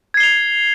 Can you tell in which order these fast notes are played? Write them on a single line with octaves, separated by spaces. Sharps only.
G#6 C7 G7 F7